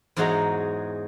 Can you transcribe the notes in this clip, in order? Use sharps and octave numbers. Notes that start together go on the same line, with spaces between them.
E2 G#2 F#3 G#3 F#4 A#5